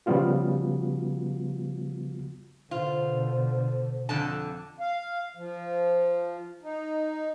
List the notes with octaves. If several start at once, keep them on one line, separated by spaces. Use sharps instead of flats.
C#3 F3 G3 B3 F4 F#4
B2 D3 F4 C5
F2 D3 A5
F5
F3
D#4